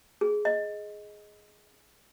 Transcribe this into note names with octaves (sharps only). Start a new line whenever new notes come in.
G#4
D#5